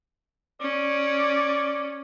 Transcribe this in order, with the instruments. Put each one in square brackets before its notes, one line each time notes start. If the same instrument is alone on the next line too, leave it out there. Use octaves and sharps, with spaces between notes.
[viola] C#4 [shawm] D5